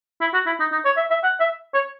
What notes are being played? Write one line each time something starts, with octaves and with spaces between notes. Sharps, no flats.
E4
F#4
E4
D#4
D#4
C#5
E5
E5
F#5
E5
C#5